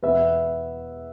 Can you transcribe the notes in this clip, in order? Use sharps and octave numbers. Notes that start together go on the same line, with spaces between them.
E2 B2 B3 B4 E5